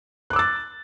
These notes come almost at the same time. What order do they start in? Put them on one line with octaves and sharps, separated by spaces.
F#6 D6 E6 A6